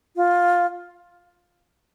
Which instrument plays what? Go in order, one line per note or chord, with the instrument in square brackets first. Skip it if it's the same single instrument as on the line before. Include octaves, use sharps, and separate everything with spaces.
[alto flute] F4